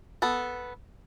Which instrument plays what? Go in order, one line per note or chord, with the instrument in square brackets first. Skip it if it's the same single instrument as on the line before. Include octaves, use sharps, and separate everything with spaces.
[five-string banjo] B3 A4